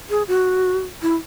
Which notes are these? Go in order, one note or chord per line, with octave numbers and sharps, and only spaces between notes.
G#4
F#4
E4